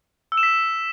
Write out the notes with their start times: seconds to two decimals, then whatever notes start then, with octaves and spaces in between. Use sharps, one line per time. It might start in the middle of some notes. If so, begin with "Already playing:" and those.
0.32 E6
0.37 E7
0.43 B6